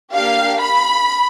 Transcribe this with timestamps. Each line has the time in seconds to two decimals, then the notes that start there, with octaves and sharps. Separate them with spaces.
0.13 A#3 D4 G4 F5
0.61 B5